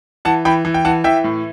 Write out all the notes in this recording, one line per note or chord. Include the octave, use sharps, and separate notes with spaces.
E3 F#5 A5
E3 G5 B5
E3
G5
E3 F#5 A5
E3 E5 G5
A2